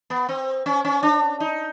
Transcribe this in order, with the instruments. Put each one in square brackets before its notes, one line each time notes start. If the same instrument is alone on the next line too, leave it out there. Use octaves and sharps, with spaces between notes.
[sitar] B3
C4
C#4
C#4
D4
D#4